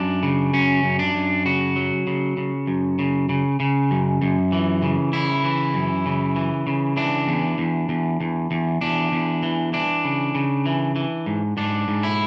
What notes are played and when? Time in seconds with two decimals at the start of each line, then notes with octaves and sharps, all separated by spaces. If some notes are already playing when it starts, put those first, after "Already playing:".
Already playing: F#2 D4
0.23 C#3
0.53 F#2 C#4
0.83 F#2
0.99 D4
1.15 F#2
1.45 C#3 F#4
1.76 F#3
2.07 C#3
2.37 C#3
2.67 F#2
2.99 C#3
3.29 C#3
3.60 C#3
3.91 F#2
4.22 F#2
4.52 E3
4.82 C#3
5.13 C#3 E4
5.44 E3
5.74 F#2
6.06 C#3
6.36 E3
6.67 C#3
6.97 E3 D4
7.28 E2
7.58 E2
7.89 E2
8.20 E2
8.51 E2
8.81 E2 D4
9.12 E2
9.43 E3
9.73 E3 D4
10.04 C#3
10.35 C#3
10.66 E3
10.96 E3
11.26 G#2
11.57 G#2 D4
11.88 G#2
12.03 E4